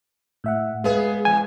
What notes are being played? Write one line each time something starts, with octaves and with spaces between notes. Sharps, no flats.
A2 E5 F#5
G#3 B3 G#4 B4 F5
E2 G#5